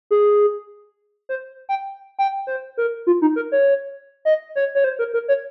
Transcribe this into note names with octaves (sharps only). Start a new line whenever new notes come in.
G#4
C5
G5
G5
C5
A#4
F4
D#4
A#4
C#5
D#5
C#5
C#5
C5
A#4
A#4
C#5